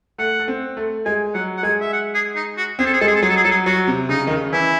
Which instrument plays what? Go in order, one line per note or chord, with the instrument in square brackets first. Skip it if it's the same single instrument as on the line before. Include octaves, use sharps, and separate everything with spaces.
[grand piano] A3 [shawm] F#5
[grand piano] A3
C4
A3
[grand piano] G#3 [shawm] G#5
[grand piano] F#3 [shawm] F#5
[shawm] F#5
[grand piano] G#3 [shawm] G#5
[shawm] E5
F#5
G#4
D#4
F#4
[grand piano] C4 [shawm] G#4
[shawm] A4
G#4
[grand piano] G#3 [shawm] A4
[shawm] G#4
A4
[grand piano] F#3 [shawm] G#4
[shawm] A4
G#4
[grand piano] F#3 [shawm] A4
[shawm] G#4
[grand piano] F#3 [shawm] F#4
[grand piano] C3
[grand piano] C#3 [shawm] D#4
[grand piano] D#3
C#3
[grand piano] E3 [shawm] E4